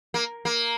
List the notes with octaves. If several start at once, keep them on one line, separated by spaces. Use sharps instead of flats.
A#3
A#3